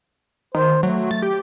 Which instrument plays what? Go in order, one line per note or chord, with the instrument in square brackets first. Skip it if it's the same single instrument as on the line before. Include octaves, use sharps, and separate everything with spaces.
[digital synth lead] D#3 [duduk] C5
[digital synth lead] F#3 [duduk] A3
[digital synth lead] A6
G4